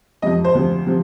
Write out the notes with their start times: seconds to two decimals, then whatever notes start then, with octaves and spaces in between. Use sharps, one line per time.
0.22 F2 C3 F3 D#5
0.45 C5
0.55 D2 C3 F3
0.87 C3 F3